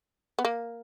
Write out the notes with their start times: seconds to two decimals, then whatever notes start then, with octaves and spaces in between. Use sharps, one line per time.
0.39 B3
0.45 A#3